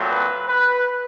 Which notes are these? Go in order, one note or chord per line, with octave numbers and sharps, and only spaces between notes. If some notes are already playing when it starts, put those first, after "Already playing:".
Already playing: A#2 F#3 A3 C4
B4
B4